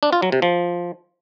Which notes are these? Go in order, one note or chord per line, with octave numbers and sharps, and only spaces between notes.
D4
F4
F#3
C3
F3